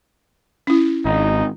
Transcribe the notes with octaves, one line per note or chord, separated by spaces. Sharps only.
C#4 E4
G#1 D#4